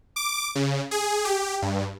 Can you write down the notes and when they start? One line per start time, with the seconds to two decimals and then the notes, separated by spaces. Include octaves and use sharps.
0.16 D6
0.55 C#3
0.91 G#4
1.25 G4
1.62 G2